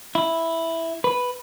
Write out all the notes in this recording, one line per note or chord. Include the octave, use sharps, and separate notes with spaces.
E4
B4